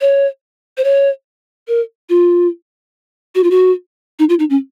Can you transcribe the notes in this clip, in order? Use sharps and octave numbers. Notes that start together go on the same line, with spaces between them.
C#5
C5
C#5
A#4
F4
F#4
F4
F#4
D#4
F4
D#4
C#4